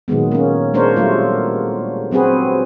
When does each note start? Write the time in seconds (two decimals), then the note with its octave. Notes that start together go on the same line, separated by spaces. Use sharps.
0.08 A#2 D#3 F#3 G#3 B3
0.32 A#3 C#4
0.74 G#3 A#3 D4 A#4 C5 C#5
0.97 F#3 G3 A3 F4
2.11 F#3 C4 F#4 G#4 B4